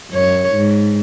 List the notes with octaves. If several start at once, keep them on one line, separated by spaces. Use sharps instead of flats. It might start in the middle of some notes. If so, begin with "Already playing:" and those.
F#2 C#5
G#2